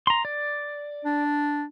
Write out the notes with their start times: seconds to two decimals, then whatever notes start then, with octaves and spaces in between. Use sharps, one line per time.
0.07 A#5 C6
0.25 D5
1.05 D4